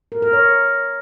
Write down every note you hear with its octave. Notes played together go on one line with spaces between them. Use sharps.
A#4
A#4
C#5